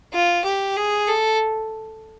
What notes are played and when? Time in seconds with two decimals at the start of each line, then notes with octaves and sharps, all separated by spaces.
0.13 F4
0.44 G4
0.76 G#4
1.07 A4